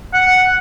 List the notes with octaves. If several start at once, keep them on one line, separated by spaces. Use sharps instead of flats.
F#5